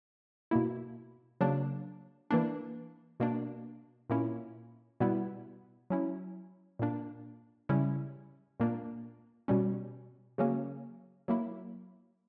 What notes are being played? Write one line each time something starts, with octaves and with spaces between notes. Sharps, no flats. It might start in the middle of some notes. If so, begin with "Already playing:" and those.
B2 A#3 E4
C#3 F#3 A#3 D4
E3 A#3 D4
B2 A#3 D4
A#2 A#3 C#4 E4
B2 G3 B3 E4
F#3 C#4 E4
A#2 A#3 D4
C#3 G3 C#4 E4
A#2 A#3 D4
B2 G3 C#4
C#3 F#3 A#3 C#4
F#3 A#3 E4